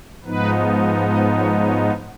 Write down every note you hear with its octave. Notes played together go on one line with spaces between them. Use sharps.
G#2 F3 B3 D#4 B4
D#5
C#5
C#5